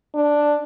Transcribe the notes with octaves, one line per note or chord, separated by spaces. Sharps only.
D4